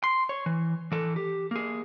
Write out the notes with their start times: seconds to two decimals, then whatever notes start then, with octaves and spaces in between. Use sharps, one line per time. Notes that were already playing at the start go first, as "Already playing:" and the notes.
0.04 C6
0.29 C#5
0.46 E3
0.92 E3 A4
1.16 G4
1.51 A#3 G#4